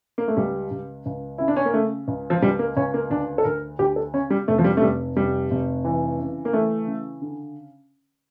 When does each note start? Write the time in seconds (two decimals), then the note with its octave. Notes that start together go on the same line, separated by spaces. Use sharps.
0.18 A#3
0.28 A3
0.37 C#2 G3
0.71 C#2
1.06 C#2
1.38 C#3 E4
1.48 D4
1.56 C#4
1.66 A#3
1.74 C#3 A3
2.08 C#2
2.30 F3
2.42 C#2 G3
2.59 A#3
2.77 C#2 C#4
2.94 A#3
3.10 D2 D4
3.38 A4
3.44 D2 A#4
3.79 D2 G4
3.96 A4
4.13 C#3 C#4
4.30 G3
4.48 F1 A3
4.58 F3
4.64 G3
4.77 A3
4.82 F1 G3
5.16 F1 G3
5.51 F1
5.85 E3
6.19 C#3
6.45 A#3
6.53 E3 A3
6.87 C#3
7.22 D3